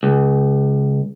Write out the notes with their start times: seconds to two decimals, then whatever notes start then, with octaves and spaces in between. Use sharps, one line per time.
0.03 C#2